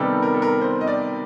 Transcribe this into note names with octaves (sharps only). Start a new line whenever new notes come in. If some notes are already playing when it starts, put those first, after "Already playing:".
Already playing: C3 D#3 G3 B3 A4
A#4
A4
A#4
C5
D#5
D5